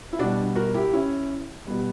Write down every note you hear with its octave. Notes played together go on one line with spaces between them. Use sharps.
E4
B2 G3 D4 F#4
F#4 A#4
E4 G4
C#4 E4
B2 G3 B3